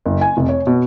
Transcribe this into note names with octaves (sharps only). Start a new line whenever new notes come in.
F#1
G#5
F1
C#5
B2